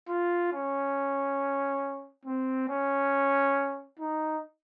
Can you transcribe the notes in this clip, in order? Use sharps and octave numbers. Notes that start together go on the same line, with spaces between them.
F4
C#4
C4
C#4
D#4